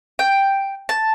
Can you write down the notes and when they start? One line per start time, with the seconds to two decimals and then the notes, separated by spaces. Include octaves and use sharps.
0.19 G5
0.89 A5